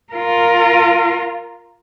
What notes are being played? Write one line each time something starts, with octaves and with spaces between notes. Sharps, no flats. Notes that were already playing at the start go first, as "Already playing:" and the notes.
F4 A#4